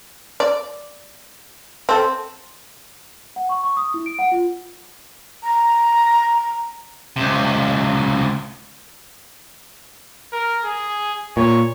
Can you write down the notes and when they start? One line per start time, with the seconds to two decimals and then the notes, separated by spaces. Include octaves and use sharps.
0.40 D5
1.89 C4 A4
3.36 F#5
3.49 C#6
3.63 C#6
3.77 D#6
3.94 E4
4.06 D7
4.19 F#5
4.32 F4
5.43 A#5
7.16 C#2 C3
10.32 A#4
10.64 G#4
11.37 A#2 C#5